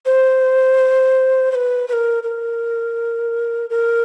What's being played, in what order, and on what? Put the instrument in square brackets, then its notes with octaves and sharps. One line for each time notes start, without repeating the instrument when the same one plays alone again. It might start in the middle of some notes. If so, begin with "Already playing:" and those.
[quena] C5
C5
B4
B4
A#4
A#4
A#4